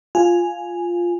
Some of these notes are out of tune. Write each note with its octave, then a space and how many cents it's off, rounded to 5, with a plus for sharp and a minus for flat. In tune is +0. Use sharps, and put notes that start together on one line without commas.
F4 +0 G#5 +0